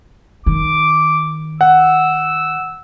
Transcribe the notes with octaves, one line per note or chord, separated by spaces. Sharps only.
D#3 D6
F#5 E6